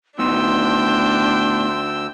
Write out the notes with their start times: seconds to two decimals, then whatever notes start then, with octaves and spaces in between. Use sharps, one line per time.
0.19 D2 A2 B3 D4 D#4 G5 C6 E6